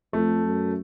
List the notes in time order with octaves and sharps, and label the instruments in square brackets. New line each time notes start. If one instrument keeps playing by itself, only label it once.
[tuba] F2 [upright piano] A3
[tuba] F#2